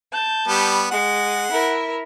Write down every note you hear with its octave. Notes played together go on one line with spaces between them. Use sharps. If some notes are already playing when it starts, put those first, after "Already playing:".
A5 G6
G3 B3
G#3 F#5
E4 A#4